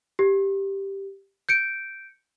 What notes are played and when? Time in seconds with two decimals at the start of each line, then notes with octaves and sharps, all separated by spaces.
0.19 G4
1.49 G6 C#7 D7